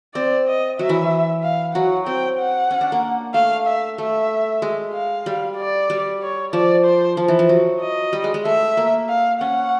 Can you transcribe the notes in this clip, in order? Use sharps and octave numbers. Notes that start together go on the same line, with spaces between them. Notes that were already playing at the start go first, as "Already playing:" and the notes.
C4 D5
D#5
F#3 E5
E3
F5
F#3 F#5
C4 G5
F#5
C#4
D4
A#3
A3 F5
E5
A3 E5
G#3
F5
G3
D5
G3
C#5
F3 D5
C5
F3
E3
F3
F#3
D#5
G3
G#3
G#3
A3 E5
A#3
F5
C#4 F#5